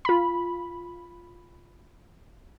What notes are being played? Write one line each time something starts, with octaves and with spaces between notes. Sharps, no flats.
F4 B5